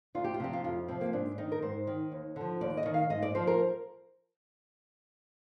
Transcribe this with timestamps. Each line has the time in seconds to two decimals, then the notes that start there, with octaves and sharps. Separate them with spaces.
0.15 D2 F4
0.24 G4
0.34 F4
0.40 C3 F3 G4
0.53 F4
0.64 F2 F4
0.88 C3 F3 C4
1.01 A#3
1.13 G#2 D4
1.38 D#3 D#4
1.52 A#4
1.62 G#2 C5
1.87 D#3
2.12 D#2
2.36 D3 F3
2.61 D#2 D5
2.77 D#5
2.86 D#3
2.94 F5
3.10 G#2 D#5
3.23 D5
3.35 F3 C5
3.47 A#4